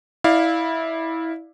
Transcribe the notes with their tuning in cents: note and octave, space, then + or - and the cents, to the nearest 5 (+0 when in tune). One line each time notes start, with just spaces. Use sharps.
E4 -15 D5 +15 F5 +0